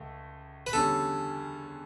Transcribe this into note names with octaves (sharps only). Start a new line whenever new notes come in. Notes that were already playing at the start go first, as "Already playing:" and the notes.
Already playing: C#2 A3
B4
E2 D3 G3 C#4 A4